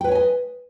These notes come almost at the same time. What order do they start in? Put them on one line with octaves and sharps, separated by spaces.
G5 B4 C#5 G#5 D#5